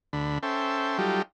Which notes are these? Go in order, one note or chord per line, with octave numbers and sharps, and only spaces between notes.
D2 D3 B5
C#4 A4 C5 E5 G5
F#3 G3 D#4 F4 G4 A4